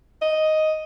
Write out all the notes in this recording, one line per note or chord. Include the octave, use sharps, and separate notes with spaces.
D#5